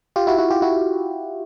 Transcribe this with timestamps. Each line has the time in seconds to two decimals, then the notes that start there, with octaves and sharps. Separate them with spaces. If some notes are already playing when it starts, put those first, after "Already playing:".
0.16 F4 G4
0.27 E4 F#4
0.38 E4 F#4
0.50 F4 G4
0.62 E4 F#4